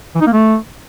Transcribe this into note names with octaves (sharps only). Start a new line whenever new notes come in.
E3
D#4
A#3
A3